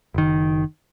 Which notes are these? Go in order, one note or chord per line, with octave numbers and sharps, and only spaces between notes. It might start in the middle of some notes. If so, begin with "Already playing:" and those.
F#1 D#3